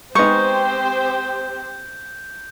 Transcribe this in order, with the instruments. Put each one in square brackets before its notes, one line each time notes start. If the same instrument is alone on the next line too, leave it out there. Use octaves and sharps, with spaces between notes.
[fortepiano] G#3 B3 D#4 [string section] C4 G4 C5 [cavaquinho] C#6 [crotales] G6